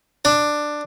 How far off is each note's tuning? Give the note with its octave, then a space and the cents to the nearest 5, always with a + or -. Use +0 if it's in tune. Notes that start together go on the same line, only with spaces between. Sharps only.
D4 +10